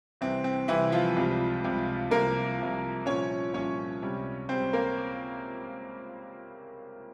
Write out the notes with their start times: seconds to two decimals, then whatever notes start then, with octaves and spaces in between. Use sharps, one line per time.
0.21 C2 C3 E3 C4
0.44 C4
0.68 C2 C3 E3 E4
0.92 F3 F4
1.16 C#2 C3 G3
1.64 C#2 C3 G3
2.11 C2 C3 F3 A#3 A#4
2.59 C2 C3 F3
3.06 C2 A#2 F3 C#4 C#5
3.53 C2 A#2 F3 C#4 C#5
4.02 C#2 C3 G3
4.49 C#2 C3 G3 C4 C5
4.73 A#3 A#4